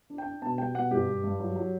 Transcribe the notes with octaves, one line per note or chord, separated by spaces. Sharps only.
D4
G5
D4
B2 A5
G3 G5
B2 F#5
G2 G4
G2
G2
F#3
F#3